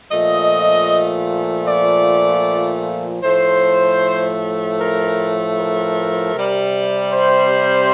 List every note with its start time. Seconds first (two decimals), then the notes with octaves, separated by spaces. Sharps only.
0.11 A#2 F3 A3 D#5
1.67 D5
3.23 A2 F3 A3 C5
4.79 A#4
5.57 A#4
6.34 C3 G3
7.12 C5